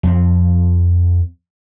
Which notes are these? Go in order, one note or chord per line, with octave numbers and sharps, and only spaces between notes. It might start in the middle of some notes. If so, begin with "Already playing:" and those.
F2 C4